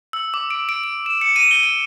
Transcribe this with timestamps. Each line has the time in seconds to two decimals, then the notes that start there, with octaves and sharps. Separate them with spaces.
0.13 E6
0.34 D6
0.51 D7
0.69 D7
0.84 D7
1.06 E7
1.21 C#7
1.36 D#7
1.51 G7
1.63 D7